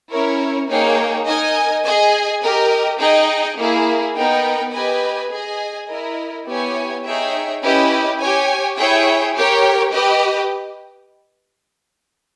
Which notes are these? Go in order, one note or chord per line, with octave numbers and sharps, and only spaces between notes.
C#4 E4 A#4 C#5
A#3 D#4 G#4 C#5 G5
D#4 A#4 D#5 G#5
G#4 D#5 G#5
G4 A#4 D#5
D#4 G#4 D#5 G5
A#3 E4 G#4
B3 D#4 A#4 D#5 G5
G4 B4 D#5 G#5
G#4 D#5 G#5
E4 A#4 D#5
B3 E4 G4 C#5 G#5
D#4 G#4 C#5 E5 G5
C#4 E4 G4 B4 D#5
G4 C#5 G#5
E4 G#4 C#5 E5 G5
G4 A#4 C#5 G5
G4 B4 D#5